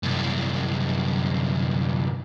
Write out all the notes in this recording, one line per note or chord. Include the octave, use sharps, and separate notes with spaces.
C2 F#2